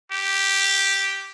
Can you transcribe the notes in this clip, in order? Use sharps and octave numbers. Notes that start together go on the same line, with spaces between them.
G4